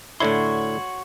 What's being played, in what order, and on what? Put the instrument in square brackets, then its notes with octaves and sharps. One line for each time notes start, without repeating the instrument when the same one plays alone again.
[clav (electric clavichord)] A2 D3 E4 [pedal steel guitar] F#4 C#5 C6